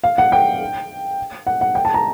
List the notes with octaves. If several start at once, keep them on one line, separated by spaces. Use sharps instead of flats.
F5
F#5
G5
F#5
F#5
G5
A5
A#5